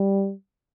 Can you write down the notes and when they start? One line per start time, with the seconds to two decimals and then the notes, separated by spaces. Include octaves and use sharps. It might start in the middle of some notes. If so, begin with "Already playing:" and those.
Already playing: G3